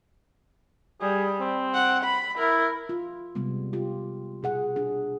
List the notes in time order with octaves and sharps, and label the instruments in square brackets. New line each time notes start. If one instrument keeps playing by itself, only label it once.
[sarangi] G3 [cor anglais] G#4
[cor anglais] C4
[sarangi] F#5
B5
[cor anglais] E4 [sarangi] A#4
[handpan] F4
C3 G3 G#3 B3
F4 G4
B2 G#4 F#5
D4 G#4